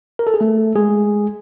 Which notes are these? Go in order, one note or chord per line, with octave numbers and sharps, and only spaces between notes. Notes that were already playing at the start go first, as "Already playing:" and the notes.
A#4
A4
G#4
A3 A4
G#3 G#4